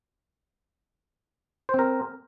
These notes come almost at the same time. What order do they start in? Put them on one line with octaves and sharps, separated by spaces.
C5 C4 A#4